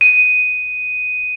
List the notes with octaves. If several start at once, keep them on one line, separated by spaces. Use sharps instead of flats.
D#7